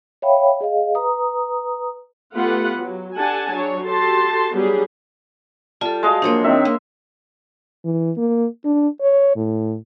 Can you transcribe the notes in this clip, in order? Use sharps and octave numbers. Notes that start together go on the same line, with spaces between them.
C#5 E5 F5 G5 B5
G#4 D#5 F5
B4 A#5 D#6
A3 B3 F4 G4 B4 F#5
F#3
D4 G4 A4 F#5 G#5 A5
F#3 D4 G#4 C#5
F#4 G4 A4 A5 C6
F#3 G3 B3 D4 G4 G#4
G3 F4 A4 A5
G#3 F#4 D#5 F5 A5
F3 F#3 A#3 D4 C#5
D#3 C4 E5
A#3
E3
A#3
D4
C#5
A2